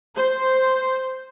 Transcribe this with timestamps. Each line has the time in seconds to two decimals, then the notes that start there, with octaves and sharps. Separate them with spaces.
0.14 C5